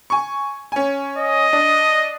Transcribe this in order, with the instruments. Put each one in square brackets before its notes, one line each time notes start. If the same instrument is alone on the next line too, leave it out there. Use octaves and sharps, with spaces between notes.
[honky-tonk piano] G#5 C#6
C#4 G#5
[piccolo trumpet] D#5
[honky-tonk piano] D4